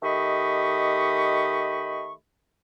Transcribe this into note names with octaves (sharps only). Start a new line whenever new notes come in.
D#3 A3 G4 D#5 B5 C#6